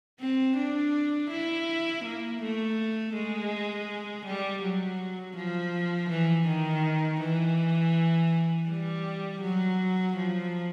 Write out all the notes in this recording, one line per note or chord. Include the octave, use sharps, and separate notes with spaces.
C4
D4
E4
A#3
A3
G#3
G3
F#3
F3
E3
D#3
E3
G3
F#3
F3